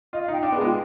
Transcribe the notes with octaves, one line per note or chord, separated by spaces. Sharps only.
F4 D#5
F5
D#4 G5
D4 G5
B3
G#3 G#4
F4